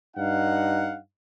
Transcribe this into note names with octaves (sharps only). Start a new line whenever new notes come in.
G2 D#4 F5 F#5